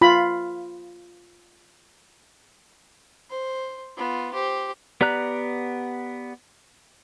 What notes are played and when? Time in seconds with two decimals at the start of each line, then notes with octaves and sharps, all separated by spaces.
0.01 F4 B5
3.30 C5
3.97 B3 F4
4.33 G4 C5
5.01 B3 G4 D5 A#5 F#6